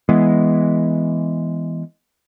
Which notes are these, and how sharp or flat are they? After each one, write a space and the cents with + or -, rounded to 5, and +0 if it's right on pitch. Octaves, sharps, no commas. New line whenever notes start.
E3 +0 G#3 +0 B3 +0